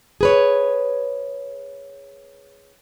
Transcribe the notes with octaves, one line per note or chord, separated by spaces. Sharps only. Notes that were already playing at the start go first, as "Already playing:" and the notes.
G#4 B4 C#5